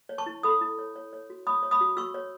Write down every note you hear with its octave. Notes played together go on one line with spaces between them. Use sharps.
C#5
A5 C#6
E4
A4 B5 D#6
E4
C#5
C#5
C#5
F#4
C#5 B5 D#6
C#5
B5 D#6
F#4
F#4 C#6 E6
C#5